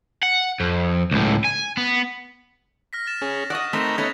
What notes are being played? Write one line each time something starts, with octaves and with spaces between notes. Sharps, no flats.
F#5
F2
C#2 A2
G#5
B3
F6 A#6 B6
F6 A6 E7
C#4 G#4
D5 D#5 F#5 C#6 D#6 F#6
A3 C4 D#4 A#4 B5 F#6 A#6 F7
A3 B3 C#4 D#4 G#6 F7